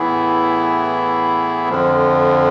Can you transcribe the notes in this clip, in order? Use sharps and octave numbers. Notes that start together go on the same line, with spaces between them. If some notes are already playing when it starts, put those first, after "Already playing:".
Already playing: A2 E3 B3 E4 G#4
F2 D3 F3